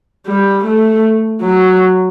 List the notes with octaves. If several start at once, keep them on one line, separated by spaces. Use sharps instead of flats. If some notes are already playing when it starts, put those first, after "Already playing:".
G3
A3
F#3